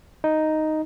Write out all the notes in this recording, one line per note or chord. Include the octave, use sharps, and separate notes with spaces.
D#4